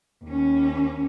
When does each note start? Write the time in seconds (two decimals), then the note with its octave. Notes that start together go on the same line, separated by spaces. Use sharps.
0.24 D#2 C#4